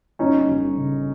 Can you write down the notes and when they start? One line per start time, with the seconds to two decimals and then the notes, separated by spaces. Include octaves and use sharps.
0.19 G1 C#4 D#4
0.48 G1
0.76 C#3